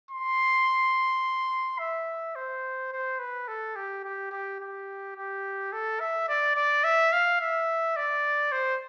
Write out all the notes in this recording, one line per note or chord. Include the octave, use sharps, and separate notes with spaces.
C6
E5
C5
C5
B4
A4
G4
G4
G4
G4
G4
A4
E5
D5
D5
E5
F5
E5
D5
C5